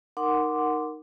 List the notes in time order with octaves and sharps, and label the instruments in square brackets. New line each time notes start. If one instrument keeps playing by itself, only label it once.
[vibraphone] D#4 A#4 F#5 C6 D6